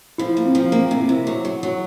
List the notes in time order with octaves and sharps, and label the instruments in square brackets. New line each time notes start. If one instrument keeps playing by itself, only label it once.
[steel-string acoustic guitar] F3 [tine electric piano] E4
[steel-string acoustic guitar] A#3
[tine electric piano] C4
[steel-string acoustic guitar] F3
[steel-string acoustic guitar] A#3 [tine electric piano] C4
[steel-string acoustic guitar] C3
[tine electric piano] E4
[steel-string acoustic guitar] C3
F#3
F#3
F#3